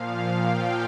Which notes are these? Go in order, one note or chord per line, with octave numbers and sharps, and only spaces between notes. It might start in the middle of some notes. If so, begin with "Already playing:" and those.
Already playing: A#2 F3 F5
G5